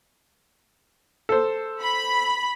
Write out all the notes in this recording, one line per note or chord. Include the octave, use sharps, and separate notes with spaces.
A4 C5
B5